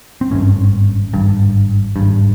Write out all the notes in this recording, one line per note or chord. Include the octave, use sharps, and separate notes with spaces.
C4
G#1 G2 C#4
G#1 G2
G#1 G2